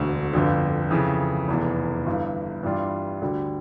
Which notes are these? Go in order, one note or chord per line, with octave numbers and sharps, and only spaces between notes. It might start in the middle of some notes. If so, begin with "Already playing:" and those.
Already playing: E1 D2 D3
G1 F2 D3
F2 C#3 E3
F1 E2 E3
G1 G2 E3
G2 E3 G3 D4 F4
D2 D3 G3